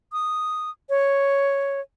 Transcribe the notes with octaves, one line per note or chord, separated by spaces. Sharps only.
D#6
C#5